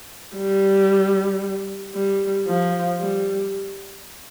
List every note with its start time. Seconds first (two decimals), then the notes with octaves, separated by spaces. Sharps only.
0.36 G3
1.94 G3
2.47 F3
3.01 G3